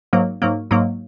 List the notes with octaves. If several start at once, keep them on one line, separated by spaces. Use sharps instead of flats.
G#2 F#3 A#3
G#2 F#3 A#3
G#2 F#3 A#3